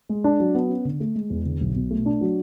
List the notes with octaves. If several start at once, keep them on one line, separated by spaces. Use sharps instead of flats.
G#3
D4
F#3
B3
C#4
D3
A3
G#3
E2
D3
B1
B2
A3
D4
F#3